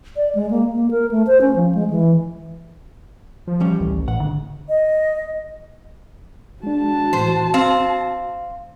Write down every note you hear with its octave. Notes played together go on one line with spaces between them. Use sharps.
D5
G#3
A#3
A#3
A#4
A3
C5
C#4
F3
G#3
E3
F3
E3 G3 C#4
A1 D2
A2 F#5
G#1 D3
D#5
G#3 D4 F#4 A5
A2 E3 C5
C4 F5